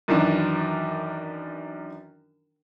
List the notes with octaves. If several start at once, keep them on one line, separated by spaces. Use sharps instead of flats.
F#2 D#3 E3 D4